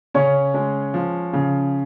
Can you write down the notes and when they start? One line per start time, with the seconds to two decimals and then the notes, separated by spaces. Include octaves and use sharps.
0.14 C#3 C#4 C#5
0.54 G#3
0.94 F3
1.33 C#3